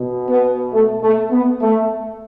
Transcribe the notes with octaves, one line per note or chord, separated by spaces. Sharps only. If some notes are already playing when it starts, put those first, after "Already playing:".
Already playing: B2
B3
A3
A3
B3
A3